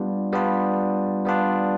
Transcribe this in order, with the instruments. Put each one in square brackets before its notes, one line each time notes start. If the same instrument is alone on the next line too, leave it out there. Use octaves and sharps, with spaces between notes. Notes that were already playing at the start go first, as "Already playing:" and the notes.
Already playing: [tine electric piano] G3 B3 D4 F4
G3 B3 D4 F4
G3 B3 D4 F4